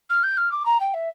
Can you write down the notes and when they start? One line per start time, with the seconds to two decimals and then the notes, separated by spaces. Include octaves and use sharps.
0.09 F6
0.23 G6
0.37 F6
0.51 D6
0.65 A#5
0.80 G5
0.93 E5